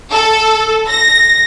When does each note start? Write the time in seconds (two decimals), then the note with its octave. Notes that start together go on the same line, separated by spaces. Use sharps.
0.11 A4
0.89 A#6